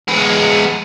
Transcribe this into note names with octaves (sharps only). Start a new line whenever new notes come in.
G#3 B3